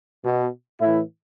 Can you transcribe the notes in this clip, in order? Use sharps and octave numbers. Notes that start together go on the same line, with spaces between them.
B2
A2 E3 E4